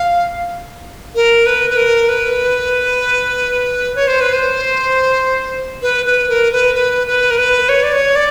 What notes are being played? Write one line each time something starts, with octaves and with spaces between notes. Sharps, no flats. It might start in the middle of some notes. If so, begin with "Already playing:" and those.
Already playing: F5
A#4
B4
B4
A#4
B4
C#5
C5
B4
C5
B4
B4
A#4
B4
B4
B4
A#4
B4
C#5
D5
C#5
D5